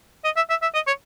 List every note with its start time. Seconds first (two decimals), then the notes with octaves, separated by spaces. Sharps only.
0.24 D#5
0.36 E5
0.50 E5
0.62 E5
0.74 D#5
0.87 C#5